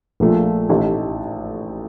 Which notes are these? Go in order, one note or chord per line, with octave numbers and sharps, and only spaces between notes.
A#1 A#2 F3 A3
A1 A2 A3 D#4 G4